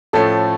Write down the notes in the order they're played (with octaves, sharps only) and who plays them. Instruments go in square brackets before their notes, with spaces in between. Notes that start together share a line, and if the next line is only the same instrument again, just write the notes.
[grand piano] A2 F3 A3 C#4 [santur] A4